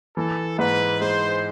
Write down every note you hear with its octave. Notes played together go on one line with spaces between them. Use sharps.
E3 A4
G#2 B4
G#3 C5